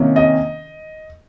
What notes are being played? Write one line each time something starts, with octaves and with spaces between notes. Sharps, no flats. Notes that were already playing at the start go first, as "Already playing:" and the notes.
Already playing: C3 D#3 A#3 C#4
D#5